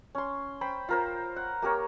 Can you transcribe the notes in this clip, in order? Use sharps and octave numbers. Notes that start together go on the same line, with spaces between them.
C#4 C6
C5 G5 B5
F4 A#4 C5
F#5
A#3 G4 A#4 C#5